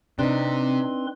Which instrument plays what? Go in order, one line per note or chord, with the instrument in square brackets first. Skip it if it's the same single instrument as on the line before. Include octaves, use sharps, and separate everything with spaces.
[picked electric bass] C3 [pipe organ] C4 B4 C6 [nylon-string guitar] D4 D#4